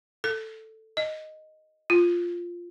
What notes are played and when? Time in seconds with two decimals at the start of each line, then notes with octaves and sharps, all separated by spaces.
0.24 A4
0.97 D#5
1.90 F4